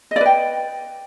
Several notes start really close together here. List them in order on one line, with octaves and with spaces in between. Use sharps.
D#5 D5 B4 G5